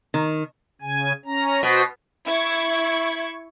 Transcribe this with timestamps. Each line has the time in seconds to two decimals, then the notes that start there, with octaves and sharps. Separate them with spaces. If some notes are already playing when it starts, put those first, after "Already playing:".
0.14 D#3
0.81 C#3 G#5
1.25 C#4 A#5
1.63 B2 F#4 C5
2.27 E4 C#6 G#6